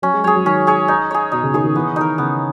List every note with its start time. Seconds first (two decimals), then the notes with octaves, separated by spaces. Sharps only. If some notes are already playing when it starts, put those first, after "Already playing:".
0.02 F#3 C#4
0.14 G#3
0.24 F#3 G#4 C#5
0.35 F#3
0.45 D#3 C#4
0.67 G#4 C#5
0.88 D#4
1.11 G#4 C#5
1.32 B2 D#4
1.43 C#3
1.54 D#3 G#4 C#5
1.64 D#3
1.76 E3 B3
1.96 D#3 D#4
2.01 A#4
2.18 C#3 B3